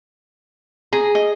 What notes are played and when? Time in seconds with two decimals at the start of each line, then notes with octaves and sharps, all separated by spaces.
0.93 G#4 A#5
1.15 D#5